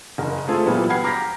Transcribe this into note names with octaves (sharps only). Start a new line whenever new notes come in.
F#1 A#4
A3 C4 F4 G#4 A4
A#2 E3 F#3 G3 B3
F#5 G5 B5 F6 G#6 C7
A#5 D6 F6 G6 A#6 B6